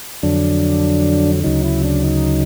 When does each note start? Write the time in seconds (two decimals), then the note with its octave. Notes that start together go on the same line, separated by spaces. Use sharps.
0.23 F2 D3 F#3 D4
1.44 D2 C#3 F#3 D#4
1.64 E4
1.84 D4
2.04 D#4